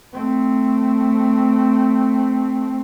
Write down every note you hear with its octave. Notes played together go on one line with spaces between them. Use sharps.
A3 C4